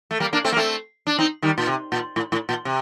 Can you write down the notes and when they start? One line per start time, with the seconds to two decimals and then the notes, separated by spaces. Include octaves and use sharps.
0.11 A3
0.20 G3 A#3
0.33 A#3 D4
0.44 A3 C4
0.52 A#3
0.57 A3 C4
1.07 D4
1.18 C4 D#4
1.42 D#3 G3
1.58 A#2
1.67 C3
1.92 A#2
2.16 A2
2.32 A2
2.49 A#2
2.65 C3